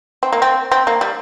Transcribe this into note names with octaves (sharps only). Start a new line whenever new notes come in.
C4
A#3
C4
C4
A#3
G3